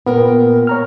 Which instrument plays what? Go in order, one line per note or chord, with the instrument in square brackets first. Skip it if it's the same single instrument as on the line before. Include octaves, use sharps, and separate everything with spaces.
[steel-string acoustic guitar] A#2 A#4 G5 [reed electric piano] B3
[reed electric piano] C#5 A#5 F6